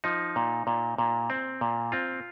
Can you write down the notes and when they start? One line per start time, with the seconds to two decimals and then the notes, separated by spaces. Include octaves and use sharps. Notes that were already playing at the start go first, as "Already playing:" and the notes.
0.04 F3 D#4
0.36 A#2
0.67 A#2
0.98 A#2
1.30 C4
1.61 A#2
1.92 C4 F4